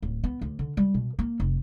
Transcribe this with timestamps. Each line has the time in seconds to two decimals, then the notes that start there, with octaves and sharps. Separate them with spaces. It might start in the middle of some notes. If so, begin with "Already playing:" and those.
0.02 D1
0.24 B3
0.42 D2
0.59 D3
0.77 G3
0.94 B2
1.19 A#3
1.40 F1